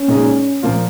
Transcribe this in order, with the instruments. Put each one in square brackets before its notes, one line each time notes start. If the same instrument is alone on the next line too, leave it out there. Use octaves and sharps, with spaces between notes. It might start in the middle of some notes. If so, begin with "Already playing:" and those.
Already playing: [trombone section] C#4
[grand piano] A#2 G#3 D#4 G#4
A#2 F3 A#3 F4